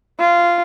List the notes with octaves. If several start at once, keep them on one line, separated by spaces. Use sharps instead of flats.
F4